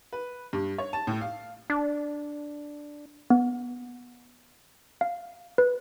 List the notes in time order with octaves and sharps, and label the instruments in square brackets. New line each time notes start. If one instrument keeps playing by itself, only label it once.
[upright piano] B4
G2
C#5
A5
A2
F5
[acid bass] D4
[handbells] B3
F5
B4